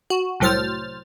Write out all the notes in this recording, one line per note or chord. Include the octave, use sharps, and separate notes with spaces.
F#4
C2 A2 F#3 C5 F6 A6